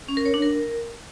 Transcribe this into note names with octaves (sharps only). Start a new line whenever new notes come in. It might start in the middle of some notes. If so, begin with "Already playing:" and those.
C#4
A#4
C#5
D4
A#4